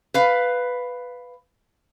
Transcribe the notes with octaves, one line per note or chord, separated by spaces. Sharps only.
B4 F5